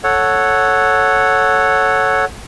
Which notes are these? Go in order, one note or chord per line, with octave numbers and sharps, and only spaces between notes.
A4 C#5 F#5